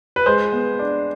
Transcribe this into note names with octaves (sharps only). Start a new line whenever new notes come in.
B4
G#3 C5
B3
D4